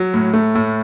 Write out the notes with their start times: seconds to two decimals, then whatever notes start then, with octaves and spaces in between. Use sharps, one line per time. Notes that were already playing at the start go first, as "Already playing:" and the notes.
Already playing: F#3
0.14 A2
0.33 A3
0.55 A2